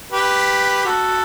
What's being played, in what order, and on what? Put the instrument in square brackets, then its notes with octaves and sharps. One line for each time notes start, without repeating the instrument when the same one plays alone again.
[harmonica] G4 B4
F#4 A4